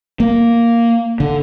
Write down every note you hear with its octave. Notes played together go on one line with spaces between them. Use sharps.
A#3
D3